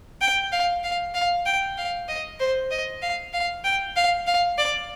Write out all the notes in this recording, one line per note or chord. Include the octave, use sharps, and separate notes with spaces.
G5
F5
F5
F5
G5
F5
D#5
C5
D#5
F5
F5
G5
F5
F5
D5